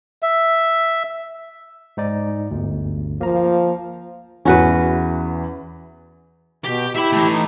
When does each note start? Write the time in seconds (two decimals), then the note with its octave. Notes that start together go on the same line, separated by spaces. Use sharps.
0.22 E5
1.97 G#2 D#4 D5
2.51 G1 D2
3.21 F3 A#3 A#5
4.45 E2 E3 C#4 F#4 B4
6.65 B2 G4
6.96 E4 G4 E5 B5
7.13 E3 A3
7.32 D#4